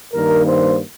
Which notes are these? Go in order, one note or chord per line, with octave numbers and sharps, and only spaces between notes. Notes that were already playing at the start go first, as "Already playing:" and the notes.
G2 D#3 A#3 A#4
C5